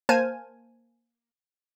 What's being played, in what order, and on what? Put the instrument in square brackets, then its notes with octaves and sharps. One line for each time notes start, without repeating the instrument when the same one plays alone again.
[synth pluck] A#3 C5 G#5 A5 F6 G#6